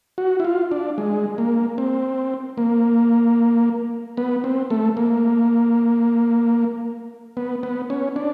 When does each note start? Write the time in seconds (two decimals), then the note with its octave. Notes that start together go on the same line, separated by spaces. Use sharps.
0.18 F#4
0.40 E4
0.45 F4
0.71 D4
0.98 G#3
1.38 A#3
1.78 C4
2.58 A#3
4.17 B3
4.44 C4
4.70 A3
4.97 A#3
7.37 B3
7.63 B3
7.90 C#4
8.16 D4